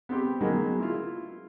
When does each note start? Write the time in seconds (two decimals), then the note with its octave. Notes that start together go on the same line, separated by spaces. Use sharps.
0.09 B3 C4 G4
0.40 C#3 F#3 G#3 A#3 B3 D#4
0.80 E4 F4